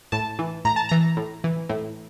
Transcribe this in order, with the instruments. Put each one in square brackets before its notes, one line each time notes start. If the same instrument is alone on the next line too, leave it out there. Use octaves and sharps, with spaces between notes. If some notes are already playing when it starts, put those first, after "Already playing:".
[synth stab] A2 A5
E3
A2 A#5
A5
E3 A#5
A2
E3
A2